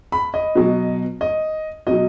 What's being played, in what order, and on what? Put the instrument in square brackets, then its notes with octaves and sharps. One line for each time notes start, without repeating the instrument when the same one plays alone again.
[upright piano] B5
D#5
B2 F#3
D#5
B2 F#3 D#5